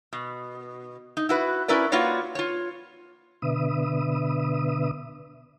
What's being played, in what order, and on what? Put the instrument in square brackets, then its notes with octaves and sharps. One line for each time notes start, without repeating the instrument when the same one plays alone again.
[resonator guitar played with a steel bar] B2
D#4
E4 F#4 B4
C#4 E4 A#4 B4 D5
A#3 F4 F#4 B4 C#5 D5
F4 C#5
[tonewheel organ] B2 D3 B4 E5 D#6